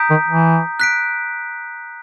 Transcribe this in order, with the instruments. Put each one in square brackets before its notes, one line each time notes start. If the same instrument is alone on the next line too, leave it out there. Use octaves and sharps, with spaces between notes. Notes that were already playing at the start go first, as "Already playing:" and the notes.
Already playing: [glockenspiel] A#5 D#6 G6 B6 D7
[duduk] D#3
E3
[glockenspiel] F#6 B6 D7